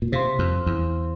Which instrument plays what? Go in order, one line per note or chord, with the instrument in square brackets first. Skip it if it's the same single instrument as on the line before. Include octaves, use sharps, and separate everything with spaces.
[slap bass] A#2
[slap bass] C3 [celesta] C5 F5 C6
[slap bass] F2
E2